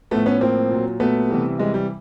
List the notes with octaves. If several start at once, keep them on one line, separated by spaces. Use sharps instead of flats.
A2 F3 A3 B3
B3 C#4
A2 F3 A#3 C4
A#2 F#3
A#2 F#3 A3 B3
C3 E3 G3
C3 E3 G3 G#3
G3